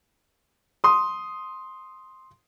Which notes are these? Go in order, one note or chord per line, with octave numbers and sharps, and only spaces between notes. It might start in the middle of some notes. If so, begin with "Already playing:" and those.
C6 D#6